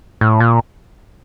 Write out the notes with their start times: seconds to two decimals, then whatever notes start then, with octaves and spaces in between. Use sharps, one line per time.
0.21 A2
0.40 A#2